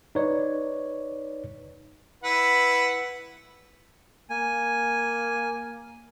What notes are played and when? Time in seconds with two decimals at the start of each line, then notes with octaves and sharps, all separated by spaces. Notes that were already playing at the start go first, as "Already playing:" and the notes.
0.15 D#4 B4 C#5 D5
2.23 E4 B4 F#5
4.30 A#3 G#5